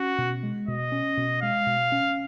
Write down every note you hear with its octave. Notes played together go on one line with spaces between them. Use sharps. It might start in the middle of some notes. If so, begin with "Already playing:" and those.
Already playing: C#4 F#4
B2
G#3
B2 D#5
C#4
B2
G#3 F5
B2
C#4